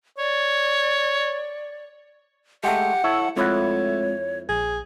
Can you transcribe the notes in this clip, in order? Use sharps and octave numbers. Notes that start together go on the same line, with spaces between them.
C#5 D5
G#3 A3 G4 F#5
E4 A4 C#5 E5
F2 G#3 A3 C4 E4 F4 C#5 F#5
A#1 G#4